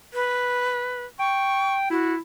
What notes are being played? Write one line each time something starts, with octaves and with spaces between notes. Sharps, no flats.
B4
G5 C#6
E4 F#4